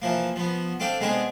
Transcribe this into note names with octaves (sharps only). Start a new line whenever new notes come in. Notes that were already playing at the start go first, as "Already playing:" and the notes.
E3 F3 A#3
F3 B3
C4 D4 A4 F5 G5
G#3 B3 C4 D4 G#5